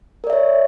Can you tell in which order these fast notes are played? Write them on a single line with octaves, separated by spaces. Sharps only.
A#4 D5 E5 C#5